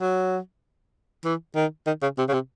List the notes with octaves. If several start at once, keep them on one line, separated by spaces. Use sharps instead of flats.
F#3
E3
D#3
D#3
C#3
C3
C#3
C3